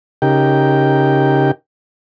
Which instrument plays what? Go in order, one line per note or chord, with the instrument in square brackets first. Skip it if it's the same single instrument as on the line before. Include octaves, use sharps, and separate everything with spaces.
[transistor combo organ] C#3 D#4 G4 A#4 G5